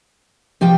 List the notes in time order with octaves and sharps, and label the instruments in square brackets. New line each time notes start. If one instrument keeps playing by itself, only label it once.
[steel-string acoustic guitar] C3 F3 G4 G5